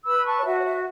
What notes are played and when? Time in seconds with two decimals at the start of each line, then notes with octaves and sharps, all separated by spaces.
0.05 B4 B5 E6
0.26 A5 C#6
0.37 C#5
0.45 F#4 E5
0.57 C#5
0.64 E5